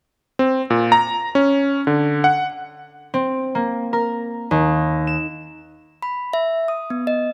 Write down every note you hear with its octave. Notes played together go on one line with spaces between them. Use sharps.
C4
A#2
A#5
C#4
D3
F#5
C4
A#3
A#4
D#2
E7
B5
E5
D#6
B3
D#5